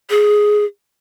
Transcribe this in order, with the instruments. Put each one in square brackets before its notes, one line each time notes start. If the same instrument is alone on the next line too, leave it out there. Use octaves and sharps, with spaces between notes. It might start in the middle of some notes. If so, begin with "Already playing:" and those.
[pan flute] G#4